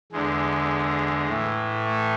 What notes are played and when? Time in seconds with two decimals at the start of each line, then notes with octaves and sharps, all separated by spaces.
0.12 E2 D3 G#3
1.27 A2 E3
1.84 A3